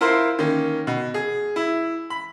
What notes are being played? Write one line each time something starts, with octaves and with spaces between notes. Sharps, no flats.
E4 F4 A#4 C5
D#3 A#3 C#4
B2
G#4
E4
B5